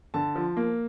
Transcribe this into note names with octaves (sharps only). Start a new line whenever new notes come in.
D3 A5
F3
A#3